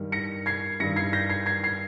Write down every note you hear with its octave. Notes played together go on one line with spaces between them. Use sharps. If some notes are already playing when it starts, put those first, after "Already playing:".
Already playing: G2 D#3 G3
A#6 C#7
G#6 C7
G2 D#3 G3 A#6 C#7
G#6 C7
G6 A#6
G#6 C7
G#6 C7
G#6 C7